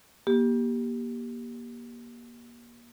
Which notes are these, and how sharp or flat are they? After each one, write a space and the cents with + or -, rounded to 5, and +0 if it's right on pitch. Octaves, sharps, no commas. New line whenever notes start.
A#3 +35 G4 +0